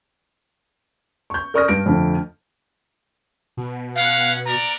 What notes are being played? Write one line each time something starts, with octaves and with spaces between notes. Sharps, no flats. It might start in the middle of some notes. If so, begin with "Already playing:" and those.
C#6 G6
A#4 D5 C#6 D#6 F6 A#6
G2 A#6 D7
F2 D3 A3
B2
B3 C#4 F5 F#5
B3 A#4 D5 A#5